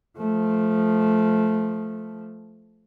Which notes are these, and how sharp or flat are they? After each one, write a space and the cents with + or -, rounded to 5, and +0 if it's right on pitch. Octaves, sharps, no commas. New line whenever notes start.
F3 +0 A3 -15